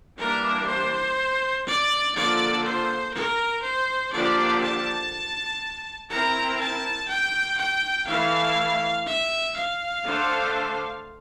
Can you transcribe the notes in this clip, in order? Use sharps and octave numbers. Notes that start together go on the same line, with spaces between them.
E3 G3 A#3 D4 G4 A#4
C5
D5
D3 F3 A#3 F4 A4 D5
C5
A#4
C5
D3 F3 A#3 D4 G4 D5
A5
C4 E4 A#4 A#5
A5
G5
G5
E3 A3 E4 F5
E5
F5
D3 A3 D4 A4 C5